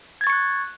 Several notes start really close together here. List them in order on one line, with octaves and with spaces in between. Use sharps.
G#6 A6 C#6 C#7 F#6